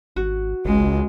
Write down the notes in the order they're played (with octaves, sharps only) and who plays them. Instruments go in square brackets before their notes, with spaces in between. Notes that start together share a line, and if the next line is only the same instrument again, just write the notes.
[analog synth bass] G#1 [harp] F#4
[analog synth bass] G#1 [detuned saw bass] C#2 [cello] G#3